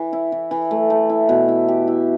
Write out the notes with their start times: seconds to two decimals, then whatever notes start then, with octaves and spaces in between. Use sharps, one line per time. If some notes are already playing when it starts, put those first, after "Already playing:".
Already playing: E3
0.13 E4
0.32 E3
0.51 E3
0.71 A3
0.90 A3
1.09 E4
1.29 B2
1.48 E4
1.68 G4
1.88 E4